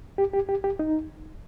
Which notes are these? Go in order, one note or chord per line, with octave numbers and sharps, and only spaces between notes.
G4
G4
G4
G4
D#4